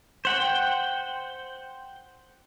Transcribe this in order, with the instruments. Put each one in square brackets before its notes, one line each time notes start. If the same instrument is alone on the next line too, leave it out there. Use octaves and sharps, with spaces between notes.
[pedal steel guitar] C5 F#5 G5